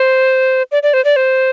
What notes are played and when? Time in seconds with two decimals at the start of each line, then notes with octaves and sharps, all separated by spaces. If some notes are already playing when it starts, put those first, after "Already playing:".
Already playing: C5
0.72 D5
0.83 D5
0.94 C5
1.05 D5
1.16 C5